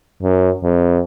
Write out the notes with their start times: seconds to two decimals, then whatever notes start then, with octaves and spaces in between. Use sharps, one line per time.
0.23 F#2
0.63 F2